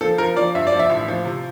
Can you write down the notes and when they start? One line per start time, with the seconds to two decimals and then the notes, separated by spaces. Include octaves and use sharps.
0.01 F3 A4
0.18 F3 A#4
0.37 F3 D5
0.55 G2 E5
0.67 D5
0.72 F3
0.79 E5
0.90 A1
1.08 F3
1.25 C3